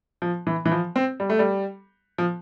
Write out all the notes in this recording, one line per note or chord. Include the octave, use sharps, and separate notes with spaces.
F3
E3
E3
F3
C4
G3
A3
G3
F3